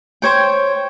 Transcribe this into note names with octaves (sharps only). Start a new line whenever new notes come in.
C5 C#5 G5